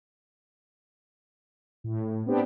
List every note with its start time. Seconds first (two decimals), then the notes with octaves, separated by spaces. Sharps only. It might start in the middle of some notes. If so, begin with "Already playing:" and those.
1.84 A2
2.26 B3 C4 D4 G4